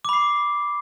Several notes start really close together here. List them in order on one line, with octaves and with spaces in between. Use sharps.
D6 B5 C7